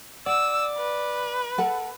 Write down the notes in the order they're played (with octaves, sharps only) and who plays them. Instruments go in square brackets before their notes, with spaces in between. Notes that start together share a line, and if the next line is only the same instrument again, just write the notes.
[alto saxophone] D5 [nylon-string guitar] F#5 [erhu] E6
[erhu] B4
[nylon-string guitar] A4 F#5 A5